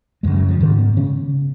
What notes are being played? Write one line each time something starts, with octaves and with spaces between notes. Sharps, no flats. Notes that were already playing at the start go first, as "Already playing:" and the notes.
F#2 C#3 G#3
F#3
F3
G#2 D#3
B3
C#3 C#4